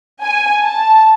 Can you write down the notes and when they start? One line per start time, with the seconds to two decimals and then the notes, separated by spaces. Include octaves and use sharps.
0.22 G#5
0.64 A5